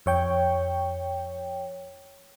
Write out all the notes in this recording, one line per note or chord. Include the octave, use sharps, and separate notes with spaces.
F2 C#5 G5